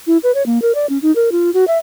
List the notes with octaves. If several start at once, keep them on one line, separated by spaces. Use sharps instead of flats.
E4
B4
C#5
A#3
A#4
D5
C#4
D#4
A#4
F4
F#4
E5